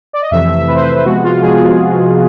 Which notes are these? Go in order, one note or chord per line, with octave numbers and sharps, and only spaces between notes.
D5
D#5
F2 C3 E3 A3 E5
E5
F2 C3 E3 A3 B4
C5
B4
C3 F3 G#3 B3 F#4
F4
C3 F3 G#3 B3 G#4